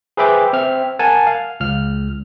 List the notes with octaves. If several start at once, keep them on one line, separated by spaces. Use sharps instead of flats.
G#4 B4 C5 E5 G5 D6
C4 E5 F6
A#4 F#5 G#5 A5
F5
C#2 F6